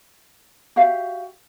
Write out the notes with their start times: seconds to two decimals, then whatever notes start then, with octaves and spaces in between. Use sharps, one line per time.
0.76 F#4 G4 E5 F5